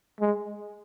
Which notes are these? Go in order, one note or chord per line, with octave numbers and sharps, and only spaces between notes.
G#3